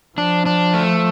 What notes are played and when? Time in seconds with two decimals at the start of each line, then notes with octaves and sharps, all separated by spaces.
0.18 F3 D4
0.46 D4
0.74 A3